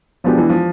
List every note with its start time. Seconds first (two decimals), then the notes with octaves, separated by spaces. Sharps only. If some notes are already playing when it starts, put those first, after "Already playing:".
0.24 B2 F3 G#3 B3 D4 G4
0.37 E3
0.49 F3